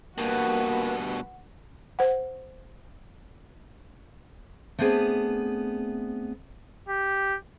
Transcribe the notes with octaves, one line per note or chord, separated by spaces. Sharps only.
G2 B2 A#3 F#4 B4 F#5
C5 F#5
A3 B3 C4 D4 G#4 B4
G4